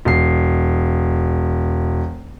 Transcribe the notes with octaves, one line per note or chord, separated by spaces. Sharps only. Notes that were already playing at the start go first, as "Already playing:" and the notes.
E1 C7